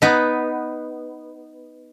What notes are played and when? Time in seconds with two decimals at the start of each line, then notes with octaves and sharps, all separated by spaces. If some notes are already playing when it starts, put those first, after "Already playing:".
0.02 B3 D#4 B4